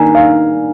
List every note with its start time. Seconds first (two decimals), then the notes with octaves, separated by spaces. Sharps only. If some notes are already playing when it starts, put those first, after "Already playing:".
Already playing: D#3 A#3 G#5 A#5
0.15 F5